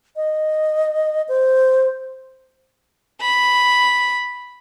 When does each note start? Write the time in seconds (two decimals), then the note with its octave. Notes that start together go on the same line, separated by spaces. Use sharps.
0.16 D#5
1.28 C5
3.21 B5